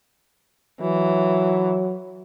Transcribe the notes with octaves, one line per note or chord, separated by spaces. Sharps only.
E3 F#3